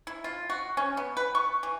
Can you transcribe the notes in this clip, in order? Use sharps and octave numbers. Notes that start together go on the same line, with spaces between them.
E4
F4
F#4
C#4
B3
B4
C#6
E3